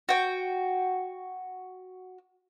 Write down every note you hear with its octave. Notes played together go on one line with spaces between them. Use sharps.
F#4 G5